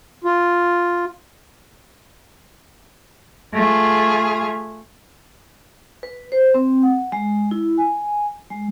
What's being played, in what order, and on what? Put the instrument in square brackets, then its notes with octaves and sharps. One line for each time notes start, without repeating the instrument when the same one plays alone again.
[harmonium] F4
[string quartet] A3 F4 G#4
[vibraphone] B4
C5
C4
F#5
G#3
E4
G#5
G#3